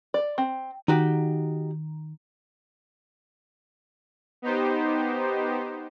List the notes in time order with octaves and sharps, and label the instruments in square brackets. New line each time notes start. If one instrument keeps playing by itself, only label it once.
[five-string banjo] D5
C4
[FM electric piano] D#3 [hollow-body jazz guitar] D#4 F#4 G4
[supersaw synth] B3 D#4 G4 C5